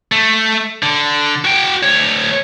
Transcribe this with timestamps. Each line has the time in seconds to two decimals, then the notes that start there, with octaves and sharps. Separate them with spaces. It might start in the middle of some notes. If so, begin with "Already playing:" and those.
0.12 A3
0.83 D3
1.45 F#4 G5
1.83 D2 C#5